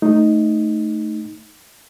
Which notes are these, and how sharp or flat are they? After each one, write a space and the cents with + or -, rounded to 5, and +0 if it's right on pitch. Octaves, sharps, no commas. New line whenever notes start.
A3 +0 D#4 +0